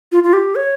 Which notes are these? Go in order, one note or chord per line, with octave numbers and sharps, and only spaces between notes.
F4
F4
G4
C#5